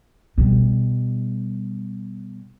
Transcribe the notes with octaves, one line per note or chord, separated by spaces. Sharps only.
B2 G3